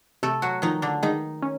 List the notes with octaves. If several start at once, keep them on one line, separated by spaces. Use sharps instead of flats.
C3 A3 A4
F#3 F#4
D#3 F3 D#4
D3 D4
D#3 G#3 D#4
C#4